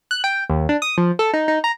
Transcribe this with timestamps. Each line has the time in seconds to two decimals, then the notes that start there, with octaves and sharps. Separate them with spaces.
0.11 F#6
0.24 G5
0.50 D#2
0.69 D4
0.82 D#6
0.98 F3
1.19 A4
1.33 D#4
1.48 D#4
1.64 A#5